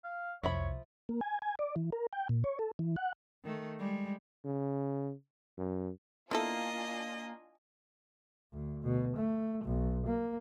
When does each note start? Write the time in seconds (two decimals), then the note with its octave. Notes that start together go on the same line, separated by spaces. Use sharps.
0.04 F5
0.43 C2 F2 F3 C#5 E5 B5
1.09 A#3
1.21 G#5
1.42 G#5
1.59 D5
1.76 E3
1.92 A#4
2.13 G5
2.29 A#2
2.44 C#5
2.59 A4
2.79 E3
2.96 F#5
3.44 D#3 A3
3.79 G3 G#3
4.44 C#3
5.58 F#2
6.31 A#3 B3 D4 E4 F4 A4 D#5 G#5
8.53 D2
8.83 B2
9.15 A3
9.64 B1
10.06 A#3